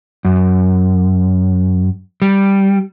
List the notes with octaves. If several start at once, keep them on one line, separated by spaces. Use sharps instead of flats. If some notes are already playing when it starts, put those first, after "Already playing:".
F#2
G3